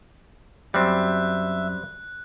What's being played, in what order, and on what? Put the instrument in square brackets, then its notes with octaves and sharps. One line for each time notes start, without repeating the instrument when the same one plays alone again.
[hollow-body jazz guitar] F#2 [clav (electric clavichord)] G3 C4 [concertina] E5 [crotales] F#6